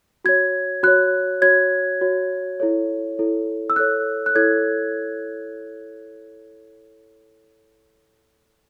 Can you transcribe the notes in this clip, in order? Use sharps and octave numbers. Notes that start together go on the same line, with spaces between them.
F#4 C#5 G#6
F#4 C#5 F#6
F#4 C#5 G#6
F#4 C#5
E4 A4 C#5
E4 A4 C#5
E6
E4 A4 C#5 F#6
F#6
E4 A4 C#5 G#6